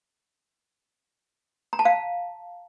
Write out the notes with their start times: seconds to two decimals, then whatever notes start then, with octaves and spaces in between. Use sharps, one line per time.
1.73 A#5
1.79 A5
1.85 F5